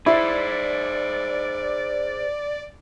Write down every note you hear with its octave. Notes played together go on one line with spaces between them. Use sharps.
E4 G#4 C5 D5